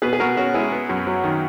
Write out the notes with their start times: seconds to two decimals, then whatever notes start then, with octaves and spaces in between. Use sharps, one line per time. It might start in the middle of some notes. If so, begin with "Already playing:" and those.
0.02 B2 G#4 B4
0.13 G#4
0.20 B2 F#4 A#4
0.37 C#4 F#4
0.54 G#3 E4 G#4
0.72 B3
0.89 F#2
1.07 F#3
1.24 D#3